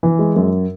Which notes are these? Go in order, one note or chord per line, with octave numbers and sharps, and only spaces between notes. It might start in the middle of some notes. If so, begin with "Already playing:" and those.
E3
G#3
F#2